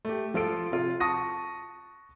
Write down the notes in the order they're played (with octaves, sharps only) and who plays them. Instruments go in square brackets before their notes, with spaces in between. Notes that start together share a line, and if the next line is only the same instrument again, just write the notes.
[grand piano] A3 G4
F3 F4 A4 D7
C3 F4
A5 C#6 D#6 A#6 D#7